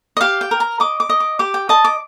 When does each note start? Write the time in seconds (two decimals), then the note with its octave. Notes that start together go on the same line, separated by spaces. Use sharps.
0.17 D#5
0.21 G4 F5
0.41 G5
0.51 A#4
0.60 A#5
0.80 D#5 D6
1.00 D6
1.10 D#5
1.20 D6
1.39 G4 D6
1.54 G5
1.69 D#5 A5
1.85 D6